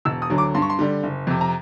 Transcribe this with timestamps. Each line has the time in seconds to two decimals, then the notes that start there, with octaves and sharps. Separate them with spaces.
0.05 E1 E6
0.22 D#6
0.30 D2 D3 F#3
0.38 D6
0.55 G2 C6
0.62 C#6
0.70 C6
0.79 D3 G3
1.03 F#1
1.27 F2 C3
1.41 A#5